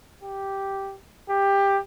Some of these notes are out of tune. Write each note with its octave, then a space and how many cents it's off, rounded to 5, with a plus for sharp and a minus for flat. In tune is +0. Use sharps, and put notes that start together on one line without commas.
G4 -5
G4 +15